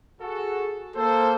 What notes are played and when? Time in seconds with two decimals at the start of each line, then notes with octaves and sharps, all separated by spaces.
0.20 F#4 G#4 A4
0.96 A#3 A4 C5